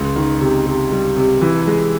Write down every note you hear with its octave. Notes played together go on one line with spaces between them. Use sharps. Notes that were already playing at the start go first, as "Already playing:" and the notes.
Already playing: C#2
D#3
C3
C3
G3
C3
E3
G#3